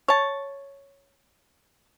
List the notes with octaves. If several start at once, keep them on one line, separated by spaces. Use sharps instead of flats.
C#5 A5